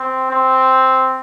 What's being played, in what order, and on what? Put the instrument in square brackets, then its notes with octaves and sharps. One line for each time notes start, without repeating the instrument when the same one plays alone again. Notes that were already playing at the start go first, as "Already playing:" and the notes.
Already playing: [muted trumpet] C4
C4